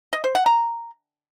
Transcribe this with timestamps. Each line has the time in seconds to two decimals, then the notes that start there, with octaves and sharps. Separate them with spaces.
0.13 D#5
0.24 C5
0.35 F#5
0.46 A#5